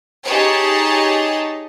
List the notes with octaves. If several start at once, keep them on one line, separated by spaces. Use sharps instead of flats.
D#4 G4 G#4 C#5 A5